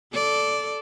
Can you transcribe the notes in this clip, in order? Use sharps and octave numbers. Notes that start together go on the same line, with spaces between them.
A4 D5